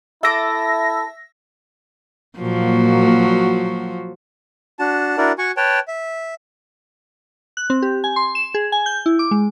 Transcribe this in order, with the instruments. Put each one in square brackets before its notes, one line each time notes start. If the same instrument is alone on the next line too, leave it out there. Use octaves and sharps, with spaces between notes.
[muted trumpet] E4 [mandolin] A4 D6 [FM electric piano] E5 E6 A#6
[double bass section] A#2 A#3 [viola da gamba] F3 F#3 F#4
[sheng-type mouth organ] D4 F#4 A5
D4 E4 F#4 A#4 D5
F#4 F#5 G#5 C#6
B4 C#5 G5 A5
E5
[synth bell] F#6
C4
G4
G#5
C6
E7
G#4
G#5
G6
E4
D6
G#3